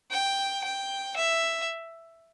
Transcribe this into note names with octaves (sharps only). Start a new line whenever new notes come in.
G5
G5
E5